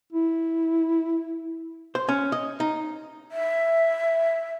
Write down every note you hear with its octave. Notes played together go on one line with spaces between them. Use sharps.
E4
C5
C#4
D#5
D#4
E5